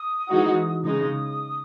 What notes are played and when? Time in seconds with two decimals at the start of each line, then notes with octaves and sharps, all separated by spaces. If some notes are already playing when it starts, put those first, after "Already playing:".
Already playing: D#6
0.29 E3 G#3 D#4 F#4
0.84 C#3 G#3 D#4 D#6